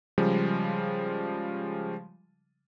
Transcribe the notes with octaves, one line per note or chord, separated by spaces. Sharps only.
C#3 F3 G3 G#3